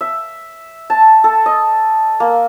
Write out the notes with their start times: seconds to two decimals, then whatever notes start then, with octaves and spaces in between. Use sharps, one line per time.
0.01 E5
0.90 A5
1.24 A4
1.46 D#5
2.20 A#3